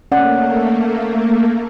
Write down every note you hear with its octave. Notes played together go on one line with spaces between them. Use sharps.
A3 A#3 C#4 D5 F#5